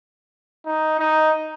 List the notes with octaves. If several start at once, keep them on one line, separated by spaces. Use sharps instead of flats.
D#4
D#4